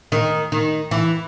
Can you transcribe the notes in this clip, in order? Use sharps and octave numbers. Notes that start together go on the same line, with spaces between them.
D#3
D#3
E3